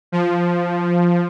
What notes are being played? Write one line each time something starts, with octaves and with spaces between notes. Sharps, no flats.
F3